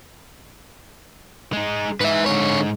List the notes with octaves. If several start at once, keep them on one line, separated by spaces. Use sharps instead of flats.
G#3 D#4
G#2 B4 E5
D3 C#5